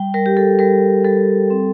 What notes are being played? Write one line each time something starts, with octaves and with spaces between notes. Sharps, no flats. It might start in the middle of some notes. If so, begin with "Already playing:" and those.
Already playing: G3 G5
G3 A#4
G4
A4
G3 A#4
G3 A4
C4